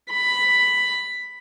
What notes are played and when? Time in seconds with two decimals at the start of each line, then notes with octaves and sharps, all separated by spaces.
0.10 B5